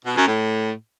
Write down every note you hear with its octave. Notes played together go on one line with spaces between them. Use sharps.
B2
F#2
A2